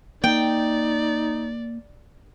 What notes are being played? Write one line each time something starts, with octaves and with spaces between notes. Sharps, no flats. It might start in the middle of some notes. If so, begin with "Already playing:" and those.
A#3 D#4 D5 G5